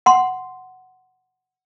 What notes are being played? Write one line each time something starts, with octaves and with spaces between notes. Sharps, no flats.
F#5 C6